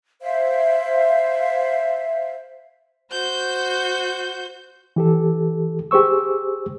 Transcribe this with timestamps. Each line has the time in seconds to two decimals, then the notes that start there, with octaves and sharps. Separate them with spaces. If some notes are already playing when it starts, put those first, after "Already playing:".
0.21 C5 E5 F5
3.10 F#4 C5 G6
4.96 E3 G4 A4
5.91 G4 G#4 C5 C#6 E6